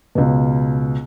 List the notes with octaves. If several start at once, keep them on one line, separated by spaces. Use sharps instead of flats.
C#2 B2